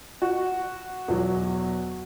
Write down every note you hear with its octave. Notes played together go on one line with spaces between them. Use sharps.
F#4
E2 B2 F#3